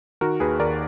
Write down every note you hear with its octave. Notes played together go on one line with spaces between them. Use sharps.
D#3 F#4 A#4
D#2 G#4 B4
D#2 A#4 D5